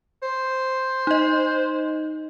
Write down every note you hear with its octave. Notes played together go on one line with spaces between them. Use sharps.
C5
D#4 D#5